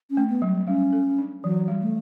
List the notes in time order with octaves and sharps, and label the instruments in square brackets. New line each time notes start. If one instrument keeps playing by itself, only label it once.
[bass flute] C#4
[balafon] A3
[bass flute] B3
[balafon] F#3
[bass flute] G3
[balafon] G3 [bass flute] C#4
[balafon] A4
D4
[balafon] E3 [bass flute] F#3
[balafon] G3
[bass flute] A3